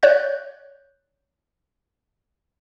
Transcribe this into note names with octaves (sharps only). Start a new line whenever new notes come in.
C#5 D5 F#6 G6